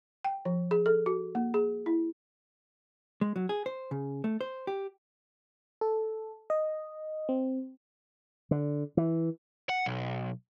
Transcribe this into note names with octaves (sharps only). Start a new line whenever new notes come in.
G5
F3
G#4
A4
F#4
A#3
G#4
E4
G#3
F#3
G#4
C5
C#3
A3
C5
G4
A4
D#5
C4
D3
E3
F#5
B1